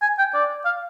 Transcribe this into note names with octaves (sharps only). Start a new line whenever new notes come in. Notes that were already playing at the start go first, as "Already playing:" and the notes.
G#5
G5
D5
F5